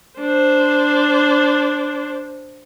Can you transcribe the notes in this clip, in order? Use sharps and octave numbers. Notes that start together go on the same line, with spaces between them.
D4 C5